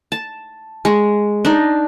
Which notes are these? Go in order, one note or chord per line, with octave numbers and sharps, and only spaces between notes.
A5
G#3 C#6
D4 D#4